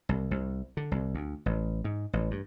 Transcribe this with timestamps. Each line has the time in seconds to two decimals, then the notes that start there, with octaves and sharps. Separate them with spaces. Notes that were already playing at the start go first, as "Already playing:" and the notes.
0.09 C2
0.31 C2
0.77 D3
0.92 C2
1.15 D2
1.46 A1
1.84 G#2
2.13 A1
2.31 G2